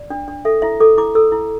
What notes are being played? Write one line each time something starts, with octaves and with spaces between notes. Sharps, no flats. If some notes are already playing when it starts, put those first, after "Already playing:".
Already playing: D5
D4
D4
A4 E5
E4 E5
A4 D6
E4 D6
A4 E6
E4